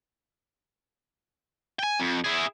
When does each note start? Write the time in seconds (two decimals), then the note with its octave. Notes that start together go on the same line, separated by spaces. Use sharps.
1.79 G5 G#5
2.00 F2
2.24 E4 G#4